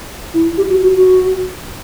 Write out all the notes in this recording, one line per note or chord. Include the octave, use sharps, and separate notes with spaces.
E4
G4
F#4
F#4
F#4